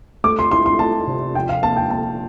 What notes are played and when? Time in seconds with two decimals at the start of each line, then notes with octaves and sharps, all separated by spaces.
0.24 A3 D6
0.39 C6
0.51 E4 C6
0.66 C6
0.79 A3 A5
1.07 C3
1.35 F3 G5
1.49 F5
1.63 A#3 A5
1.76 G5
1.90 A#3 A5